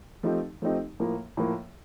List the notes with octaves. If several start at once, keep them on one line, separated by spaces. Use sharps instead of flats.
F3 A3 C4 D#4 G4
F3 A3 C4 D#4 G4
A2 F3 A#3
A2 F3 A#3